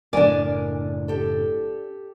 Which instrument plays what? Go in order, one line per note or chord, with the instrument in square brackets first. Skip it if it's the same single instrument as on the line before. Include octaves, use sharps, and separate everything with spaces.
[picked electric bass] F#1 A2 [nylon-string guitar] D4 D5 [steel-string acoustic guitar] A#4 G#5
[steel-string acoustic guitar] G4 A4